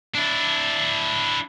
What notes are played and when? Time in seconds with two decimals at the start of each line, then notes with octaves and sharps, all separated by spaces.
0.14 D4 E4